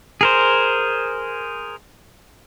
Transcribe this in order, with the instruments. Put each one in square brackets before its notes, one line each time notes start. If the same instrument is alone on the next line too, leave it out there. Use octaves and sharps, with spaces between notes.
[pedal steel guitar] G#4 A#4 C5